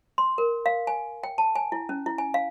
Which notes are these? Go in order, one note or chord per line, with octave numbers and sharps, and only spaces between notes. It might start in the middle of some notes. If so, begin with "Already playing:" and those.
C6
A#4
F5
G#5
G5
A5
G#5
E4
C#4
E4
G#5
F5